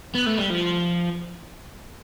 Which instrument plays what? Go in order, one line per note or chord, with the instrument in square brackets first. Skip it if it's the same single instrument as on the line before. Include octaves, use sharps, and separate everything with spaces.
[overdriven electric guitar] B3
A3
G3
F3